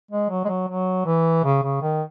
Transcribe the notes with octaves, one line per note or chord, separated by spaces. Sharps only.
G#3
F#3
G#3
F#3
F#3
E3
C#3
C#3
D#3